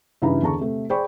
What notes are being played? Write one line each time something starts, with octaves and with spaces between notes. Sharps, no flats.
G2 C#3 E3 D#4 A#5 B5
E2 D3 A5 A#5 C#6
C3 A3
G#4 C5 D5 G5 B5 C#6